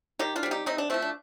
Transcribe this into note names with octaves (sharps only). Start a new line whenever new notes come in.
D#3 D#4 G4
D4 F4
G3 C4
D#4 G4
C3 C4 D#4
D4
F3 A3 C4
D4